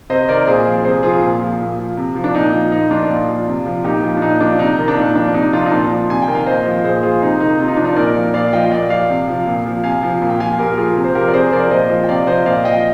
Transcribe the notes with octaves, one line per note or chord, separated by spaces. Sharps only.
C3 C5 D#5
D#3 A#4 D5
A#2 G#4 C5
F3
C3 G#4 C5
F3 F4 G#4
A#2
F3
A#2
F3
C3
F3
D4
A#2 D#4
F3
A#2 D#4
F3 D4 F4
A#2
F3
C3
F3
A#2 D#4 G4
F3
D4
A#2 D#4
F3 D4
C3 D#4
D#3
D4
A#2 D#4
F3 D4
C3 D#4
F3 D4 F4
D#4
A#2 D4 F4
F3
C3 G#5
G5
D#3
F5
A#2 C5 D#5
F3
A#2 G#4 C5
F3 F4 G#4
C3 D#4
D#3 D#4
C3 F4
D#4
F3 D4
D#4
A#2 A#4 D5
F3
A#2 D5 F5
F5
F3 D#5 G5
A#2 D5 F5
F3 D5 F5
C3
F3
A#2
F3
C3 F5 G#5
F3
A#2
G5
F3 F5 G#5
A#2 G4 A#4
F3 F4 G#4
C3
C5
F3 G4 A#4
D5
C3 G#4 C5
F3 A#4 D5
A#2 C5 D#5
F3
G5
C3 D5 F5
F3 C5 D#5
A#2 D5 F5
F3 D#5 G5